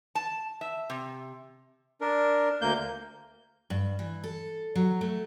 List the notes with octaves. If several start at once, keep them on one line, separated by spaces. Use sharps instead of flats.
A5
E5
C3
D4 A#4
D2 A#3 G6
G2
E3
A4
F#3
A3